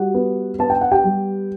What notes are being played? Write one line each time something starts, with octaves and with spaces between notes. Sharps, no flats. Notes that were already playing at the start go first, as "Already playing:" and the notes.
Already playing: G3 F#4 F#5
B3
B3 A5
G5
F#5
G4 G5
G3